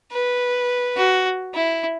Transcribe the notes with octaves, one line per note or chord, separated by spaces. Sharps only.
B4
F#4
E4